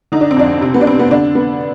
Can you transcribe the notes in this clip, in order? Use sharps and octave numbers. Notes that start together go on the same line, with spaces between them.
D3 D#4
D4
C4
F2 D4
C3 C4
B3
D4
B3 C4
B3
D3 D4
B3